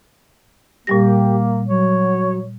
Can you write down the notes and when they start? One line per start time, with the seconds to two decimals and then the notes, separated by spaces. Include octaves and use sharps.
0.87 A#2 G3 A#3 G4 A#6
1.68 F#3 C#5